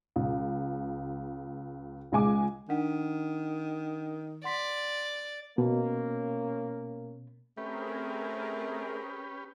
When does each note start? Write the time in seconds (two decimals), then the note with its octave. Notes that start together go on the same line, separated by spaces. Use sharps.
0.16 C#2
2.12 C#2 G#3 G#5 D6
2.69 D#3 D4 F#5
4.44 D5 F#5 C6 B6
5.58 B2 A#3 C#4
7.57 A3 C4 C#4 G4 G#4 A#4 B4